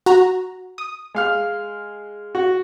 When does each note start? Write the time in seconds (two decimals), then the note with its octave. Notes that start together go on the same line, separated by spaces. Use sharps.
0.06 F#4 A#5
0.78 D#6
1.15 G#3 F5 F6
2.35 F#4